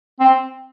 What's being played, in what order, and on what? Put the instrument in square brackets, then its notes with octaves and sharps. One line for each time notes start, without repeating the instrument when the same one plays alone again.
[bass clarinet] C4